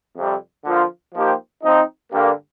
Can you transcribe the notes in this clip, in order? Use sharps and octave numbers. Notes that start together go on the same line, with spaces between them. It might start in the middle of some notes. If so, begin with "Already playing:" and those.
F2 C3 G3
D3 F3 A#3 F4
F3 A#3 D#4 G4 C5
F3 C4 D#4
G2 D3 G3 A#3